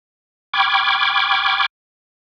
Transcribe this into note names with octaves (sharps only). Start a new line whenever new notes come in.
G5 B5 C#6 D6 F6 G#6